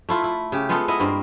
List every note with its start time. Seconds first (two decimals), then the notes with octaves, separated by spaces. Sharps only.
0.09 A3 E4 F4
0.24 E4
0.52 C#3 G4
0.69 G#3 B3 F4 A4
0.88 B3 E4 D#5
1.00 G2 A#3 C4